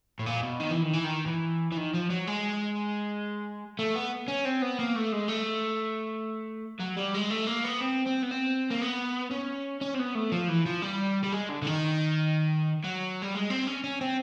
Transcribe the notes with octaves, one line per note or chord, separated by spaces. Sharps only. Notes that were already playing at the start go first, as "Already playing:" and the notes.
A2
A#2
B2
D#3
E3
D#3
E3
D#3
E3
E3
D#3
F3
F#3
G#3
A3
B3
C#4
C4
B3
A#3
A3
G#3
A3
F#3
G3
G#3
A3
A#3
B3
C4
C4
B3
C4
A#3
B3
C#4
C#4
C4
B3
A3
F3
E3
F3
G3
G3
G#3
D3
D3
D#3
F#3
G3
G#3
C4
C#4
C#4
C4